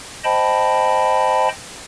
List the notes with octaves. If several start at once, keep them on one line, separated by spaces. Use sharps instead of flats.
C5 D#5 G5 A5 B5